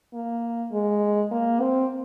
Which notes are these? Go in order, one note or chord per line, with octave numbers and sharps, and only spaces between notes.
A#3
G#3
A#3
C4